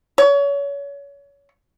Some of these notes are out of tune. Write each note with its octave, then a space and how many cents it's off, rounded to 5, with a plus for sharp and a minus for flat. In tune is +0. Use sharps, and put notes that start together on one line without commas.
C#5 +30